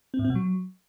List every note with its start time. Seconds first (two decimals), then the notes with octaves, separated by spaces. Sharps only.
0.14 C4
0.19 A2
0.25 C4
0.30 B2
0.35 F#3